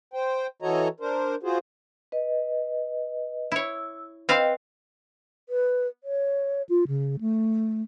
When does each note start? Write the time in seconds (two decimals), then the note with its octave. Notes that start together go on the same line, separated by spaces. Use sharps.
0.14 C5 G5
0.62 E3 F#4 A4 C#5 D#5 A#5
1.00 D4 A#4 C5
1.43 F4 F#4 G#4 C5
2.12 B4 D#5
3.52 E4 C#5 E6
4.29 C4 B4 D#5 F5 G5
5.49 B4
6.04 C#5
6.69 F4
6.88 C#3
7.21 A3